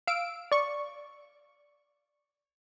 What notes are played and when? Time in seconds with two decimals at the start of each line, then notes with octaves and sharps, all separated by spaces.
0.07 F5 E6 D7
0.52 D5 C#6